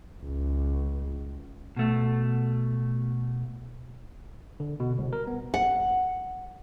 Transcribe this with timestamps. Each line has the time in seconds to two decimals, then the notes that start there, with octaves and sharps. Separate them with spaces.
0.23 C#2
1.77 B2 A3
4.60 D3
4.80 B2
4.98 C2
5.13 A#4
5.27 B3
5.54 F#5